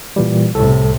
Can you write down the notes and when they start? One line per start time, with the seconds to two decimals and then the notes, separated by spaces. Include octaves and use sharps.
0.16 A#2 E3 G3
0.54 C2 A2 C3 A4